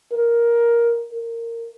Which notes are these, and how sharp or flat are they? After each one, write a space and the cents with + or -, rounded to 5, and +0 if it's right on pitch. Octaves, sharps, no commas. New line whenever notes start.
A#4 +10
A#4 -15